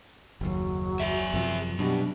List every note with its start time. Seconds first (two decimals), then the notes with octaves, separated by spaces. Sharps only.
0.41 F#1 D#2 F#3
1.00 G#4 E5
1.34 F#2 C3 F3
1.79 B2 F#3 G3 D4